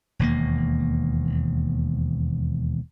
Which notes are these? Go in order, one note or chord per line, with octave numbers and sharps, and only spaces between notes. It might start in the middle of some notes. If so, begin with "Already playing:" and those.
E1 D#2 A#3